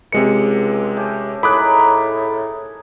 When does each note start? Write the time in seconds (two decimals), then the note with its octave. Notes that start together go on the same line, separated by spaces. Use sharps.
0.13 C#2 C3 G#3 C#7
0.97 A3 C#4 G4
1.43 A2 D#4 G#4 A#4 B5 D6 F#6